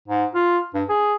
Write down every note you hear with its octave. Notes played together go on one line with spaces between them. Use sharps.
G#2
F4
G2
G#4